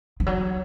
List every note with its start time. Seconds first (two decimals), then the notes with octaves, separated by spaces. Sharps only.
0.20 F3
0.26 F#3